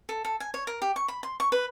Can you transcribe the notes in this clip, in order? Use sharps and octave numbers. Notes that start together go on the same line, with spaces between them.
A4
A4
G#5
C#5
A#4
G4
C#6
B5
C6
C#6
B4